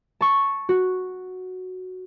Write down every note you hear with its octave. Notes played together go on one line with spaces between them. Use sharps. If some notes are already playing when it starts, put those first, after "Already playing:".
A5 C#6
F#4